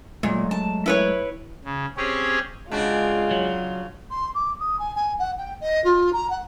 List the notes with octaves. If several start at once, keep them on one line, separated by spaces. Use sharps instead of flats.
A#2 F#3 G#3 A3
A5
E4 B4 C#5
C#3
C4 C#4 G4 G#4 C#5
C#3 G#3 D4 F4 F#4
F#3
C6
D6
D#6
G#5
G#5
F#5
G5
D#5
F4
A#5
F#5